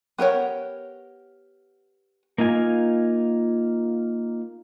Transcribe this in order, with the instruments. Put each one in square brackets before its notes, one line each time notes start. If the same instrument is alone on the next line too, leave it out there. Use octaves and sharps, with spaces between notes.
[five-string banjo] B3 G4 A#4 C#5 F#5
[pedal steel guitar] A#3 D#4 F4 G#5